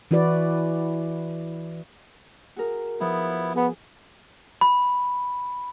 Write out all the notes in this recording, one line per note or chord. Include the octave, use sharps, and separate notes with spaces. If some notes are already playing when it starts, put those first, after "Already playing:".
E3 E4 F#4 B4 D5
F#4 G#4 A#4
F3 B3 E4 D#6
B3 G#4
B5